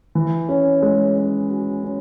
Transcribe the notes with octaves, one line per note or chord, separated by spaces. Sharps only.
E3
C#4
G#3
C#4
F#4
C#4